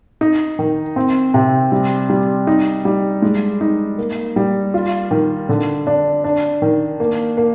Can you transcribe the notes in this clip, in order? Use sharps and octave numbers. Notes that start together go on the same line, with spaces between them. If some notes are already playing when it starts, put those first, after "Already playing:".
D#4
D#3
C4
C3
G3
G3
D#4
G3
G#3
D#4
A#3
G3
F4
D#3
D3
D4
D4
D#3
A#3
A#3